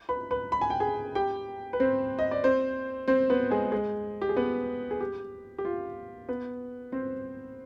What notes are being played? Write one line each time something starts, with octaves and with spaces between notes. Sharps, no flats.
B4 B5
B4 B5
B5
G#5
G5
G#4 G#5
G4 G5
B4
C4 C5
D#5
D5
C4 C5
C4 C5
B3 B4
G#3 G#4
G#3 G#4
G4
G#4
B3 B4
G#4
G4
G4
F4
B3 B4
C4 C5